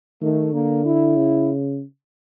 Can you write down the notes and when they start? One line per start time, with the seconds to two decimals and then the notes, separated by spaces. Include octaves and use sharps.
0.21 D#3 A3
0.53 D3 A#3
0.85 E4
1.16 C#3